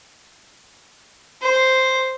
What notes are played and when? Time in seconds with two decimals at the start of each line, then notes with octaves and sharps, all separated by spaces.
1.42 C5